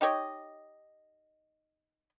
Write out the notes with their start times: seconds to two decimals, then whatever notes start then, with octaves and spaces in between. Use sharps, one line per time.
0.01 D#4 G4 C#5 D#5